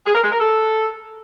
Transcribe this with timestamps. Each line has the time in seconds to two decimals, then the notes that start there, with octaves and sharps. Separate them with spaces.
0.06 G#4
0.15 A#4
0.23 G#3
0.32 A#4
0.41 A4